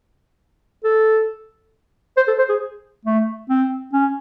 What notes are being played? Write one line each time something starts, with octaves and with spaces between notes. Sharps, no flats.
A4
C5
A4
C5
G#4
A3
C4
C#4